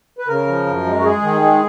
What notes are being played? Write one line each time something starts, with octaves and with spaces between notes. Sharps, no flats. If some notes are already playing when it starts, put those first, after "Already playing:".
B4
C#3 A#4
F3
F#2
G#3
F#4
G#3 G#4
D#3
G#3